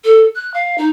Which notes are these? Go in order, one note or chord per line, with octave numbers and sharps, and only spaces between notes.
A4
F#6
F5
D#4